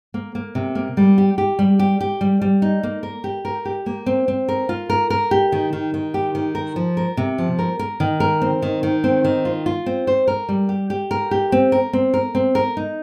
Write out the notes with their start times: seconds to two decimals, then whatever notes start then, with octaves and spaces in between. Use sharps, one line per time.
0.14 A#3
0.35 A#3
0.55 C3
0.75 A#3
0.97 G3
1.18 G4
1.38 G4
1.59 G3
1.79 G4
2.00 G4
2.21 G3
2.42 G3
2.62 D#4
2.83 A#3
3.03 A#4
3.24 G4
3.45 A#4
3.65 G4
3.86 A#3
4.06 C4
4.28 C4
4.49 A#4
4.69 F4
4.90 A#4
5.10 A#4
5.31 G4
5.52 D#3
5.73 D#3
5.94 D#3
6.14 G4
6.35 D#3
6.55 A#4
6.76 F3
6.97 A#4
7.17 C3
7.38 F3
7.59 A#4
7.79 A#4
8.00 D#3
8.20 A#4
8.42 C4
8.62 D#3
8.83 D#3
9.04 C4
9.24 D#3
9.45 F4
9.66 F4
9.86 C4
10.07 C5
10.28 A#4
10.49 G3
10.69 G4
10.90 G4
11.11 A#4
11.31 G4
11.52 C4
11.72 A#4
11.93 C4
12.14 A#4
12.35 C4
12.55 A#4
12.77 D#4